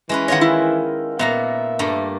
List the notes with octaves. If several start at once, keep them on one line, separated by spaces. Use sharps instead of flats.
E3 G#3 C#4 B4
D#3 F4 C#5 D#5 F#5
E4
A#2 A#3 B3 E5 A#5
G2 A3 A#3